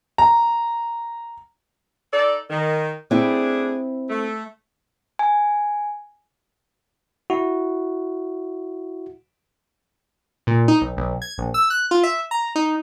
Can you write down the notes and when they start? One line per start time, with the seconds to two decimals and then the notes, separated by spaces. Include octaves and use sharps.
0.18 A#5
2.12 D#4 A4 D5
2.50 D#3
3.11 A3 C4 D4 E4 G#4
4.09 A3
5.19 G#5
7.30 E4 F#4
10.47 A#2
10.68 D#4
10.81 B1
10.97 B1
11.22 G#6
11.38 A#1
11.54 E6
11.70 F#6
11.91 F4
12.03 E5
12.31 A#5
12.56 D#4